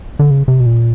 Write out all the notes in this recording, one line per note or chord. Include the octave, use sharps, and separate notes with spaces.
D3
C#3
C3
B2
A#2